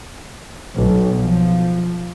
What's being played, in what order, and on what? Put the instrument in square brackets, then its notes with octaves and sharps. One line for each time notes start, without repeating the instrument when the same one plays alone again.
[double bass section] B1
F3